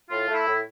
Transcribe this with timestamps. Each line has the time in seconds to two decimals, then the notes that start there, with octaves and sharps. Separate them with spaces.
0.10 A2 F4
0.28 A3
0.34 E4
0.46 A2